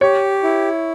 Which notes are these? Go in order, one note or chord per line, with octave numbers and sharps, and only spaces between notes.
G4 C#5
E4